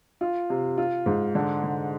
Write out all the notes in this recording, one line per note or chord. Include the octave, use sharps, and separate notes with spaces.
F4
C3
F4
G#2
D3
D3